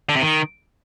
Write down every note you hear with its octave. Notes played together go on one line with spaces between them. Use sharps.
D3
C3
D#3